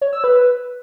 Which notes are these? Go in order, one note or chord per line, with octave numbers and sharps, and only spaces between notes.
C#5
E6
B4